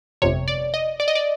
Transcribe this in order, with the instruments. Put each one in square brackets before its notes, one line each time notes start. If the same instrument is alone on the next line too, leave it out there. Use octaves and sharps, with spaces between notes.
[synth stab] G1 F2 C3 C#5
D5
D#5
D5
D#5
D5